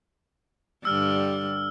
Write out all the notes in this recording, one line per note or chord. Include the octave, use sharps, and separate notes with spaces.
G2 D3 G3 E6 F6